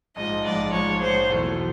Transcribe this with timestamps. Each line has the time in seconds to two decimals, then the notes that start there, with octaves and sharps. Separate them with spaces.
0.16 A#1 G#2 F3 D#5
0.45 A#1 G#2 F3 D5
0.72 A#1 G#2 F3 C#5
1.00 A#1 G#2 F3 C5
1.29 E2 B2 F#3 A3
1.57 F#3